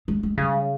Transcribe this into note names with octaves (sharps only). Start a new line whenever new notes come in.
G#3
G#3
C#3 G3